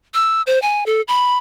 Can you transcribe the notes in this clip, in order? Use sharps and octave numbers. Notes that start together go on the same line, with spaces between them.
E6
C5
G#5
A4
B5